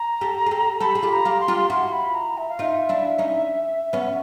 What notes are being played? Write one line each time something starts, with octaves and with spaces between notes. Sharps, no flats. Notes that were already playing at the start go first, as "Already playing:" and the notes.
Already playing: A#5
G4 A4
G#4
G4 A4
G4 A4 B5
G#4
F4 G4
A#5
F4 G4
C6
F4 G4
E4 F#4 C6
B5
A#5
E5
F5
D#4 F4 E5
D4 E4
C#4 D#4
B3 C#4